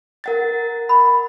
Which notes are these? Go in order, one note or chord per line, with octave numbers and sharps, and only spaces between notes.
A#4 F#5 A6
B5